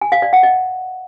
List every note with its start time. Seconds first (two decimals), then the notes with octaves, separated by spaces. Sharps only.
0.01 G#5
0.12 F5
0.22 D5
0.33 F#5
0.43 D#5